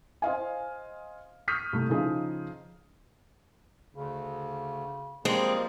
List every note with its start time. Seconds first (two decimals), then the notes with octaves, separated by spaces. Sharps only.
0.22 C5 D#5 F5 G#5
1.48 C#6 D#6 F6 G6 B6
1.73 C2 A3
1.90 C#3 F3 D#4 G#4
3.95 D2 C#3
5.25 F3 G3 G#3 A#3 C4